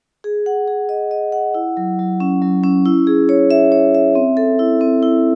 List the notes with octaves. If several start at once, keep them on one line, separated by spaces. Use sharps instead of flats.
G#4
F#5
G#4
D#5
D#5
F#5
E4
F#3
F#3
C#4
F#3
C#4
E4
G#4
C#5
E5
C#5
E5
C4
A4
E4
C4
E4